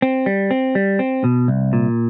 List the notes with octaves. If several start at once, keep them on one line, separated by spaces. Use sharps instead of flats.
C4
G3
C4
G3
C4
B2
C2
A#2